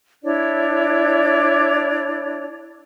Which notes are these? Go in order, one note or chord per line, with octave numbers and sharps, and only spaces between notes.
D4 E4 C#5 D5